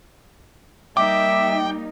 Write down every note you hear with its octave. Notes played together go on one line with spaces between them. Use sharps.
G3 A#3 D#4 E5 G5 D6